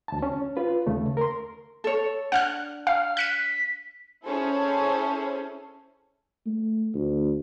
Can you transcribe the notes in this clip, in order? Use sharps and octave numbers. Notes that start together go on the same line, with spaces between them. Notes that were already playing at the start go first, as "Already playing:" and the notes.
D2 A5
C#4
F4 B4
D#2 C#3 A3
A#4 C6
A4 C#5
D4 F#5 F6 F#6
F5 F6
F#6 B6 C#7 D#7
C#4 E4 G#4 A4 C5 C#5
A3
D2